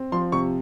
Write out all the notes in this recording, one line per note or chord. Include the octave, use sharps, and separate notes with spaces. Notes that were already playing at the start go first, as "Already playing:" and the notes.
Already playing: C4
F3 C6
C3 C#6